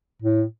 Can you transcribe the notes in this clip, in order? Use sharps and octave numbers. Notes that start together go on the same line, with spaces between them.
A2